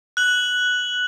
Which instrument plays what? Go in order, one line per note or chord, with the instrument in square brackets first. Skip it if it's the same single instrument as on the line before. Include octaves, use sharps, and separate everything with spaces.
[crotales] F#6 F#7